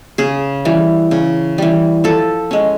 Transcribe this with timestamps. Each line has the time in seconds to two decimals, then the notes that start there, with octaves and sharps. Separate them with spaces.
0.18 C#3 G#4
0.65 E3 G3
1.11 C#3
1.58 E3 G3
2.04 F3 A4
2.51 G#3 C#4